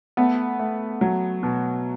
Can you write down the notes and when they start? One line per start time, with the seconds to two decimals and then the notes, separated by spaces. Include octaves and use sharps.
0.17 A3 B3
0.59 A3
1.01 F#3
1.43 B2